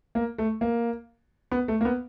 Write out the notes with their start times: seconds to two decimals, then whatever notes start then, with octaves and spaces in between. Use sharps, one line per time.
0.15 A#3
0.38 A3
0.61 A#3
1.52 B3
1.68 A3
1.81 A#3
1.85 B3